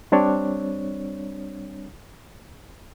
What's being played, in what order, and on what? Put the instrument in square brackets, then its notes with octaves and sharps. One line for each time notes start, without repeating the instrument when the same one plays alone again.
[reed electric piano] G3 C4 D4 C#5